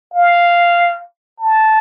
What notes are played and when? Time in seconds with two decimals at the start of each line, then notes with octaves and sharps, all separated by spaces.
0.14 F5
1.40 A5